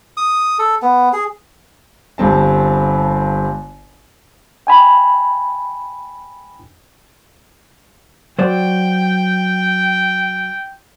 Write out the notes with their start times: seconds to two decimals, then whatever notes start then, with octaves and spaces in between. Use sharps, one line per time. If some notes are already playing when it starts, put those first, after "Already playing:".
0.17 D#6
0.59 A4
0.82 B3
1.13 G#4
2.18 G1 G2 C4 A5
4.67 G5 G#5 B5
8.39 F#3 C5 D5 G5